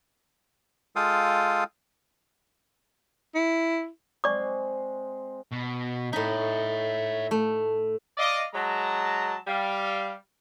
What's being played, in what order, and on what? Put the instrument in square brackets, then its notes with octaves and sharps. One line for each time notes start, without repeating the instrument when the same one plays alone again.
[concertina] G#3 F4 A4 F5 G5 D#6
[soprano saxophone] E4
[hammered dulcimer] G#3 C4 [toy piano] D5 C#6 D6
[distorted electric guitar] B2
[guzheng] A2 D#4 [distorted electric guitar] C#5 E5
[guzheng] A3
[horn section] D5 D#5 F5
F#3 G#3 A5 A#5
G3 F5